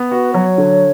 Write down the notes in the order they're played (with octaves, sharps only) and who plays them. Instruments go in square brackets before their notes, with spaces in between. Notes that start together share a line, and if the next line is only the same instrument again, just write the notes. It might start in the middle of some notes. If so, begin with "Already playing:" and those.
Already playing: [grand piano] B3
[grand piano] F#4 [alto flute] B4
[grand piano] F#3 [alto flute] C#5
[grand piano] D3